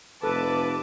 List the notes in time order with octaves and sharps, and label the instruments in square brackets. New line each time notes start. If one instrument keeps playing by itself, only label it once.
[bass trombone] F1 [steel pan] A4 [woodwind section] B4 [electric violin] A5 D6